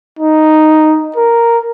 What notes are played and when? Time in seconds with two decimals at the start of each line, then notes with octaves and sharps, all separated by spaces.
0.19 D#4
1.16 A#4